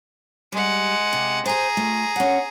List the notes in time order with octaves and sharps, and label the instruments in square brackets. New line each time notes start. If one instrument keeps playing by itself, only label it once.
[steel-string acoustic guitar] G3 [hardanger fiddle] G#3 F#5
[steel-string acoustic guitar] C3
[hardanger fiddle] G#4 A#5 [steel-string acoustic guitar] C5 G#5
[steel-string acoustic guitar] A3 F4
C#4 F#5